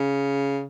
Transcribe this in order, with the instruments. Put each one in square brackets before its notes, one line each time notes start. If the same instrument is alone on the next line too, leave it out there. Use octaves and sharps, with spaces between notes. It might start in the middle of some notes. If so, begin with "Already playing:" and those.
Already playing: [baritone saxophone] C#3